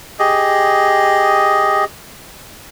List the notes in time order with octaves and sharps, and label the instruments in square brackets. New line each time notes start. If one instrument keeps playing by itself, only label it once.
[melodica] G4 G#4 D#5